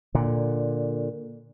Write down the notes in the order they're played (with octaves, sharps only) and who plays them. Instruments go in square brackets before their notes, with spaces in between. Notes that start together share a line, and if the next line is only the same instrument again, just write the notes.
[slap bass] A#2 D3